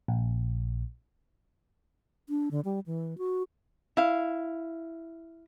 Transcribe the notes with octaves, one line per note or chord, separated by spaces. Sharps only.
A#1
D4
D3
G3
E3
F#4
E4 F5